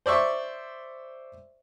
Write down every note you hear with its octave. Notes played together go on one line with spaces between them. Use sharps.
C5 D5 E5 C#6